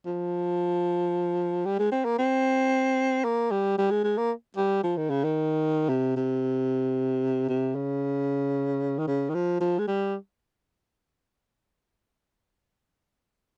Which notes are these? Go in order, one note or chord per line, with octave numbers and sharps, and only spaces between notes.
F3
G3
G#3
C4
A#3
C4
A#3
G3
G3
G#3
G#3
A#3
G3
F3
D#3
C#3
D#3
C3
C3
C3
C#3
D#3
C#3
D#3
F3
F3
G#3
G3